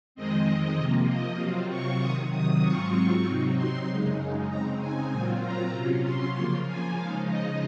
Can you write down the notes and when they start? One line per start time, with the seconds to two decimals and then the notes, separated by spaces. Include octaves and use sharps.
0.15 F2 D#3 G#3 C4 D#5
0.78 C3 F3 A#3
1.08 D#5
1.40 C3 F#3 C4 F4
1.70 C#6
2.01 C3 D#3 F#3 D#6
2.32 D#6
2.63 G#2 F#3 C4 F4 C#6
3.25 C3 F#3 C4 D#4
3.56 C6
3.87 F#2 C#3 G#3 D#4
4.49 C#3 G#3 C4 D#4 A#5
4.80 G#5
5.11 A#2 F#3 C4 F4 G#5
5.41 A#5
5.72 C3 F#3 C#4 F4
6.04 C6
6.35 C#3 F3 A#3 F4 C6
6.66 G#5
6.96 C#3 F3 G#3 D#4 F5
7.27 D#5